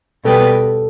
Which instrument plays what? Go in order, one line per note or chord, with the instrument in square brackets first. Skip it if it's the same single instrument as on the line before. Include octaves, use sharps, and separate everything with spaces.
[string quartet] B2 G3 B3 G4 B4 [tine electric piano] A4